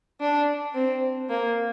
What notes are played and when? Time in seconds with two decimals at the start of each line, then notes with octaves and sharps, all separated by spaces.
0.20 D4
0.74 C4
1.30 A#3